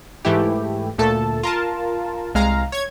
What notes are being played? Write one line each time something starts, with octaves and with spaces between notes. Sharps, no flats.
G#2 E3 A3 E4 G4
D2 A#2 A3 A4 A5
F4 A#4 A5
C2 G#3 F5 A#5
C#5 G#6